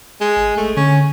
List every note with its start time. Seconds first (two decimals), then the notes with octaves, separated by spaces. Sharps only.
0.21 G#3
0.37 G#1
0.57 D#1 A3
0.77 D3 C#4